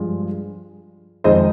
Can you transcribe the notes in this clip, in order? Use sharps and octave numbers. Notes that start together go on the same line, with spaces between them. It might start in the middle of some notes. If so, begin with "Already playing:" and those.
Already playing: G2 F3 G#3
F2 D#3 G#3 C5 D#5